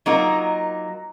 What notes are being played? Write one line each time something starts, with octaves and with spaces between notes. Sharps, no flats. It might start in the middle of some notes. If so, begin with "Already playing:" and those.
F#3 A#3 D#4 F4 A#4